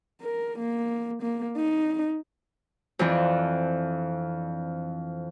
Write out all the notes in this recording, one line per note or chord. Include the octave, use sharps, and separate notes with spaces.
A#4
A#3
A#3
D#4
F2 E3 C4 D4